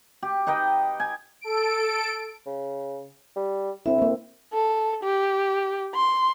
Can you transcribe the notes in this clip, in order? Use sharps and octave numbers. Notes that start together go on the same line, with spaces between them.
G4
D#4 B4 D#5 G5
G#5
A4 D7
C#3
G3
D2 C4 E4 E5
A#3 C4
A4
G4
C6